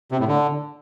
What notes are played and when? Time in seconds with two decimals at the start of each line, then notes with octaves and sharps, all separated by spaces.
0.12 C3
0.20 A2
0.28 D3